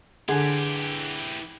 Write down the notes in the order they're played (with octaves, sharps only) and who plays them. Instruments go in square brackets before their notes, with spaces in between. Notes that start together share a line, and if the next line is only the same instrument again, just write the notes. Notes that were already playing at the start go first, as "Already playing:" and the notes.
[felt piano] D3 [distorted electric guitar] E3 G4 [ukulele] G#4